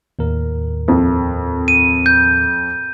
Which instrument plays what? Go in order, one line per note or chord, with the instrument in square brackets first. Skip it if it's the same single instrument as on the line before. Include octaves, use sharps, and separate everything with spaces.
[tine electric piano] D#2 A2 A#4
[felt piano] F2
[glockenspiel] D#7
G6